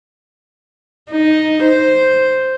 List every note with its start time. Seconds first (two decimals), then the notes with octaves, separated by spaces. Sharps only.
1.11 D#4
1.65 C5